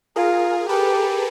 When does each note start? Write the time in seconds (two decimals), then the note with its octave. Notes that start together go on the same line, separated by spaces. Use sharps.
0.16 F4 G#4 A#4
0.69 G4 A4 B4